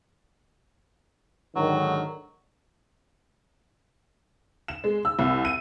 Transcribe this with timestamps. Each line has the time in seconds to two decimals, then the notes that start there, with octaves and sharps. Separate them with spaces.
1.56 G#2 D3 D#3 F#3
4.68 E7
4.84 G#3
5.05 E6
5.19 C2
5.45 D#7